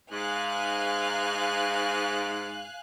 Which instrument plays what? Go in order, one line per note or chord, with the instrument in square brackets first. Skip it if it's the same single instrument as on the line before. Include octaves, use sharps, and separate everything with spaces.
[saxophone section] G#2 [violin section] F5 G#5 F#6